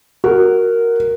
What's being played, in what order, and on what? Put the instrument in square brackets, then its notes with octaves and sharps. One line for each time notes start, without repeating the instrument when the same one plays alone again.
[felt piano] F#4 [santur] A#4